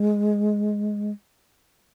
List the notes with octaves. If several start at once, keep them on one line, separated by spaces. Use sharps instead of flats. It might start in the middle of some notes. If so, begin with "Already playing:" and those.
Already playing: G#3